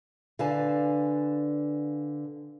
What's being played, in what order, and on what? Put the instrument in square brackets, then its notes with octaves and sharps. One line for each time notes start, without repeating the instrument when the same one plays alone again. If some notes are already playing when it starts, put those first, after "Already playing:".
[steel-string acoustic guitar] D3 B4 D5 F5 G#5 A5